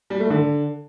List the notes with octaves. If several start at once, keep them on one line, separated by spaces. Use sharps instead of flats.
G3
A3
D3